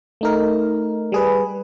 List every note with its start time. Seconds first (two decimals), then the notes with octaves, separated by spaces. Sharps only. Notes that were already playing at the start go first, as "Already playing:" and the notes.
0.21 A3 D#4 A#4
1.12 G3 G#4 B4